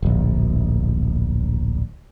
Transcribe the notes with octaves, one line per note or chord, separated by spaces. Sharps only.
D1 A#1